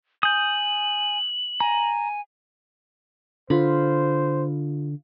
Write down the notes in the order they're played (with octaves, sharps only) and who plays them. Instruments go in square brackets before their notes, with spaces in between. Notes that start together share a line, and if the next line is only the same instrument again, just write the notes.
[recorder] G#5 [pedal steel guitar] D#6 G6 [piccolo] F#7
[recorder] G#5 [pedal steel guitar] A#5
[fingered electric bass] D3 [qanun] F4 B5 [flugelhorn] C5